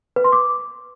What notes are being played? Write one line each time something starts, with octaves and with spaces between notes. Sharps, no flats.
B4
C6
D6